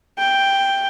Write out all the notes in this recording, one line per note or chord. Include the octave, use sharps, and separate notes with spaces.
G5